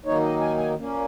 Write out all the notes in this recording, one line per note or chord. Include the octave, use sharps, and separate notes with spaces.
D#3 F#3 A#3 D#4 C#5
D#5
G#5
G#5
A#2 A#3 C#4